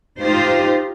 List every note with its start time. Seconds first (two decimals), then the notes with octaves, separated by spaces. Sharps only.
0.21 D#4 F4 G4 C5